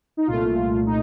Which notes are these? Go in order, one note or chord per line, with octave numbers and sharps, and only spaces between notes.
D#4
C2 A#2 A3 F4
D#4